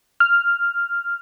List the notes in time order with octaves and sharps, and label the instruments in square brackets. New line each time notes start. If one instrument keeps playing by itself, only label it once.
[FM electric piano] F6